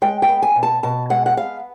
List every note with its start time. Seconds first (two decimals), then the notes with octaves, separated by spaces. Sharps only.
0.02 G#3 G5
0.22 G5
0.29 B3
0.42 G#5
0.56 B2
0.63 A5
0.83 B2 A5
1.10 G#3 F#5
1.26 F#5
1.37 B3 F5